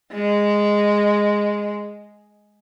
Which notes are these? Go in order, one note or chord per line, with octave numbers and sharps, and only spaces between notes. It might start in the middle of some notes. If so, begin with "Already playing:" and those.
G#3